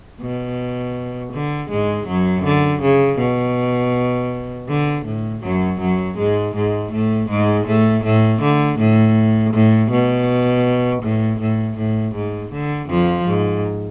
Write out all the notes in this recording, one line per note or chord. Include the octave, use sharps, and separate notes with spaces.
B2
D3
G#2 G#3
F#2 F#3
D3
C#3
B2
D3
A2
F#2 F#3
F#2 F#3
G#2 G#3
G#2 G#3
A2 A3
G#2 G#3
A2 A3
A2 A3
D3
A2
A2
B2
A2
A2
A2
G#2
D3
F2 F3
G#2